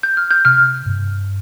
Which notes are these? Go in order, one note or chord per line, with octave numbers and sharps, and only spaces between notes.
G6
F6
G6
C3 F6
G2